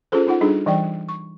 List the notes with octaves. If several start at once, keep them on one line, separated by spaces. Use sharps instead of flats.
C#4 F4 G#4 A4 C5
C#4 D#4 F4 F#5
G3 D4 D#4 G#4 A4
E3 G3 D5 G5
C#6